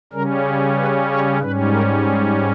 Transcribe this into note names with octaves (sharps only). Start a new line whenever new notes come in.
C#3 G3 C#4 A#4
G#4
B4
C#5
G#2 G3 C#4 B4
A#4
G#4